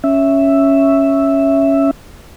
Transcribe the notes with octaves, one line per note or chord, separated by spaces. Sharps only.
C#4 E5